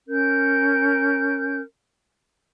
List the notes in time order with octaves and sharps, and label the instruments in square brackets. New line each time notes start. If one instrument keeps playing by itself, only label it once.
[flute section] C#4 A#4 G6